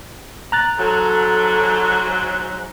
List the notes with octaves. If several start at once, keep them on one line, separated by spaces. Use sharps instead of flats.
A#5 F#6 A6
G#2 F#3 A4